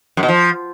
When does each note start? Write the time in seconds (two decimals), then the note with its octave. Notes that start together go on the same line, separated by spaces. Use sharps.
0.17 F#2
0.23 B2
0.28 F3